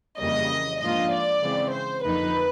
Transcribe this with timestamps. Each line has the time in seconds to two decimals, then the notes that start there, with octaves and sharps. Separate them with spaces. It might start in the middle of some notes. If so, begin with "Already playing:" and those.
0.19 F2 C#3 E3 G3 A#3 D#5
0.81 G#2 F3 A#3 D4 F4 D#5
1.12 D5
1.43 C#3 E3 G#3 C4
1.74 C5
2.05 F2 D3 F3 A#3 D#4 B4